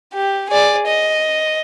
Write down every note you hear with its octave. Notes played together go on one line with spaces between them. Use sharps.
G4
G#4 D5
D#5